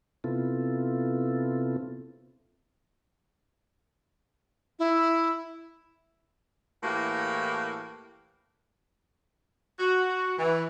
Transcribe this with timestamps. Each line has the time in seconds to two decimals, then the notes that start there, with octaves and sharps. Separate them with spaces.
0.24 C3 B3 C4 E4 F4 A4
4.79 E4
6.83 A2 E3 A#3 F#4 G4
9.79 F#4
10.38 E3